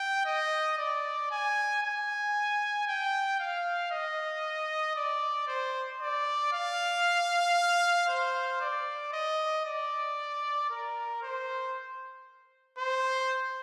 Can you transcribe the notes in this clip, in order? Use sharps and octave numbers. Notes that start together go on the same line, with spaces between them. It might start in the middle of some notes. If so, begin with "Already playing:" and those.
Already playing: G5
D#5
D5
G#5
G#5
G5
F5
D#5
D5
C5
D5
F5
C5
D5
D#5
D5
A#4
C5
C5